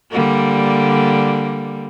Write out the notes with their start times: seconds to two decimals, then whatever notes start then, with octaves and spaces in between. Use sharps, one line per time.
0.11 D3 G3 A#3